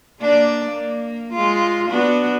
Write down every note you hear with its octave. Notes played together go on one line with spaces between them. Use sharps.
A#3 D4 D5
A#3
G#3 F4
B3 D4 F#4